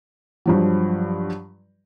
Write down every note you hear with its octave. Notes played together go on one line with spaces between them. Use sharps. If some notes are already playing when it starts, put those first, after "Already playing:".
G2 F3 F#3